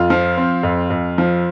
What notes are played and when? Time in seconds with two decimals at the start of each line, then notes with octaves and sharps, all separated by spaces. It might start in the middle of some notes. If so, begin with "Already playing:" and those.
Already playing: F2 F4
0.10 F3
0.37 C4
0.63 F2
0.90 F2
1.18 F3